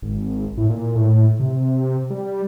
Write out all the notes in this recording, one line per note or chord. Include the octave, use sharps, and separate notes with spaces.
G#1
A2
A#2
A2
C3
G3